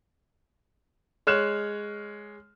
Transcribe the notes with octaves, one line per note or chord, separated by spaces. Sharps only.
G#3 C#5 F6 F#6 E7